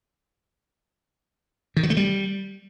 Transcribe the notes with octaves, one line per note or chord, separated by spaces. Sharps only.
D#3
F#3
A3
G3